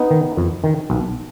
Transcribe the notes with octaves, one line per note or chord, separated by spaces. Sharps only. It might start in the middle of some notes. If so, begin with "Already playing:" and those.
Already playing: B3 D#4
D#3
F2
D#3
B1